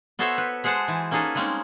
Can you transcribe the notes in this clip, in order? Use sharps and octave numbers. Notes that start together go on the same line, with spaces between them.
B3 F#4 A4 C5 C#5 E5
B4
G#3 G#4 C5 F#5 A5
E3
A#3 C#4 D#4 G#4 A4 B4
G3 G#3 A#3 C4 C#4 D#4